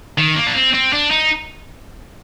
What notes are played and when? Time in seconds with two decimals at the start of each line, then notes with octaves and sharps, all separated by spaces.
0.18 D#3
0.36 A#3
0.46 D4
0.55 C4
0.73 C4
0.93 D4
1.11 D#4